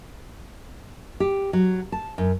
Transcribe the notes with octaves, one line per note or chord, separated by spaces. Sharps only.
G4
F#3
A5
F#2